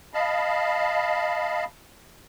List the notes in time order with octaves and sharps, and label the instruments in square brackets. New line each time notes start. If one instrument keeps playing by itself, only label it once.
[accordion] D#5 F5 A5 B5